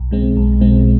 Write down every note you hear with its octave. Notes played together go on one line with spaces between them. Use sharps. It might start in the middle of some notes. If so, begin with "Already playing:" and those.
Already playing: B1
B2 G#3 C4
B1
B2 G#3 C4